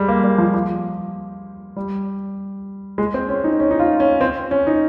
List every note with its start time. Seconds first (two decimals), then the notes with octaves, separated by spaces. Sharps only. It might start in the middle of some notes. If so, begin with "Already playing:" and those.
Already playing: G3 G#3
0.08 A#3
0.24 G3
0.38 F3
0.54 F3
1.76 G3
2.98 G#3
3.14 C4
3.29 C#4
3.44 D#4
3.60 C#4
3.71 D#4
3.79 F4
4.00 C#4
4.21 C4
4.51 C#4
4.67 D#4